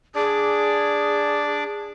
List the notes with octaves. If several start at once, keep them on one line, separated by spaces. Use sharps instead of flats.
D4 G#4 D5